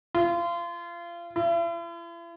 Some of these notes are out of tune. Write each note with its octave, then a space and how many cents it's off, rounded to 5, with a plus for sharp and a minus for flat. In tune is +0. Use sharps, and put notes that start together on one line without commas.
F4 -30
E4 +45